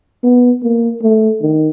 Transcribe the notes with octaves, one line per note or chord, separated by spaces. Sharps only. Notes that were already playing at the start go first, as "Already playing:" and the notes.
B3
A#3
A3
D#3